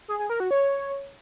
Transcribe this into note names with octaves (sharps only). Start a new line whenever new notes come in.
G#4
G#4
A#4
F#4
C#5